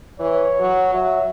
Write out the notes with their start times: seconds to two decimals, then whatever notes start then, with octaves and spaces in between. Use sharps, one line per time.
0.20 E3 C#5
0.60 F#3
0.94 F#3 E5